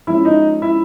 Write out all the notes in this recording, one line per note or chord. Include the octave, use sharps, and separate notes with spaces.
F3 G#3 C#4 E4 E5
D#4 D#5
E4 E5